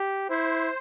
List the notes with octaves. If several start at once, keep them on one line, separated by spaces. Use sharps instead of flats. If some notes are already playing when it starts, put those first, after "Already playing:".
Already playing: G4
E4 C5